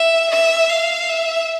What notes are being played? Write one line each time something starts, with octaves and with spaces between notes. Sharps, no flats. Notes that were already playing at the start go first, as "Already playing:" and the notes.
Already playing: E5
E5
F5
E5